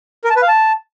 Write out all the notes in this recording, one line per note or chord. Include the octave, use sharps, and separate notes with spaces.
A#4
A5
B4
F5
A5